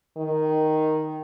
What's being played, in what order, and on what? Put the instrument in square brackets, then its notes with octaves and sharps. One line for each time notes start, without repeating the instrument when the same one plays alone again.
[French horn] D#3